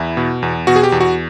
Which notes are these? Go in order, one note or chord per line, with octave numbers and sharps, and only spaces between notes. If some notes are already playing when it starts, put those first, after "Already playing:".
Already playing: E2 E4
B2
E2
B2 F#4
G#4
G4
E2
F#4